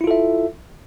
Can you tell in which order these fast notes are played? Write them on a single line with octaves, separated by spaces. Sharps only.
E4 F4 A4 E5